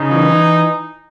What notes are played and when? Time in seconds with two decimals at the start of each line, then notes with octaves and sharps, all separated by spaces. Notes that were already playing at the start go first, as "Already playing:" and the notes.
Already playing: C#3 D#4
0.11 E3
0.29 E3